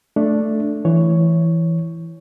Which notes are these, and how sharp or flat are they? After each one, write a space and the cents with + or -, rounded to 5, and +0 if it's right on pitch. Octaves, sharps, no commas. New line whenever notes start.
A3 +0 D4 +0
E3 +5 C#5 +0